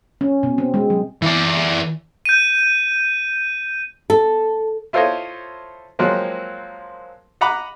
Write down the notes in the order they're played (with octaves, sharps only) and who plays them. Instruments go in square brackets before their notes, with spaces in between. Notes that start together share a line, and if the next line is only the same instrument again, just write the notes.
[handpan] C#4
B2
C4
G#3
F#3
[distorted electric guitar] E3 D5
[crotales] G6 D#7
[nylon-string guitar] A4
[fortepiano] E4 F4 A4 C5 C#5 D#5
F3 F#3 G#3 A#3 C4
D#5 F#5 A#5 B5 D6